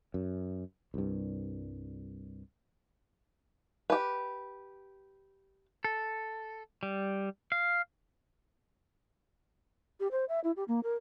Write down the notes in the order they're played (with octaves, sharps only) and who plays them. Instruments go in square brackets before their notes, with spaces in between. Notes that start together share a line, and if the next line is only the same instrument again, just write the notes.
[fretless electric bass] F#2
C2 G2
[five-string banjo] G4 B4
[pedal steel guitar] A4
G3
F5
[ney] G4
C5
E5
E4
G4
A#3
A#4